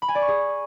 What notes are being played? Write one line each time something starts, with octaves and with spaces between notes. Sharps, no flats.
B5
G#5
D5
C#6
G#4